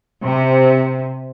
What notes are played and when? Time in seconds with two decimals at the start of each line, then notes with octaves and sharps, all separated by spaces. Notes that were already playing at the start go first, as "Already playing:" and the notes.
0.24 C3